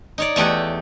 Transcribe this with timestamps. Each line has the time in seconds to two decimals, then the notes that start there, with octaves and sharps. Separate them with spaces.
0.18 D#4 C#5 D5
0.36 E2 A3 G4 D#5 F#5